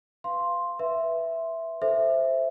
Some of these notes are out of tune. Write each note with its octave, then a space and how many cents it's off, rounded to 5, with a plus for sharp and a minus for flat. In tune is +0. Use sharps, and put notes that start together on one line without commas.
B4 +15 F5 -10 C6 +5
B4 -5 E5 +0 C6 +0
A4 +0 C5 +0 E5 +0